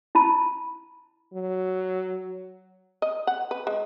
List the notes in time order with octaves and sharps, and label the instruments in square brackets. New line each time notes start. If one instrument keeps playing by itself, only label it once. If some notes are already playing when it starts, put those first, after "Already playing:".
[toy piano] E4 A5 B5
[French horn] F#3
[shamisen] D#5
F#5
B4
G#3